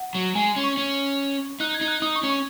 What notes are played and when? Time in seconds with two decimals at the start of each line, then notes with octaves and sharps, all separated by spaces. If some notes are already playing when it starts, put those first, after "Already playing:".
Already playing: F#5
0.15 F#3
0.35 G#3 G#5
0.56 C#4
0.64 C#6
0.77 C#4
1.60 D#4 F#6
1.74 G#6
1.81 D#4
1.88 F#6
2.02 D#4 D#6
2.16 C#6
2.23 C#4
2.30 C#6